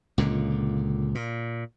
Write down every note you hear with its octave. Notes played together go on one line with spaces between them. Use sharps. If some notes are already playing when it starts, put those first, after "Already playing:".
C#2 A#2 D3
A#2